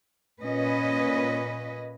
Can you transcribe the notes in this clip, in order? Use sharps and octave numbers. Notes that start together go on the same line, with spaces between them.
A#2 C#4 B4 D#5